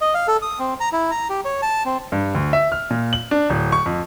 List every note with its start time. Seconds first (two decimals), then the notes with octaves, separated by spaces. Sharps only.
0.01 D#5
0.14 F5
0.28 A4
0.42 D#6
0.59 C4
0.80 A#5
0.93 E4
1.11 A#5
1.30 G4
1.45 C#5
1.62 A5
1.85 C4
2.12 G2
2.35 D2
2.53 E5
2.72 F6
2.90 A#2
3.13 F#7
3.31 D4
3.50 D1
3.72 C#6
3.86 F2